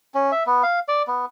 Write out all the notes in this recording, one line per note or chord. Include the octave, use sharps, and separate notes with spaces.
C#4
E5
B3
F5
D5
B3